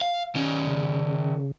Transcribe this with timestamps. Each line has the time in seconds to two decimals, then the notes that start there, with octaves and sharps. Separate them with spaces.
0.01 F5
0.35 D#3 C#4
0.67 C#3